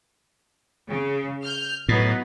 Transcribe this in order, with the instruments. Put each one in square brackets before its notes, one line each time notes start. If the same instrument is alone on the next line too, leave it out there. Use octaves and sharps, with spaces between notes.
[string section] C#3
F6 G6
[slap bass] A2 [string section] F#3 B3 D#4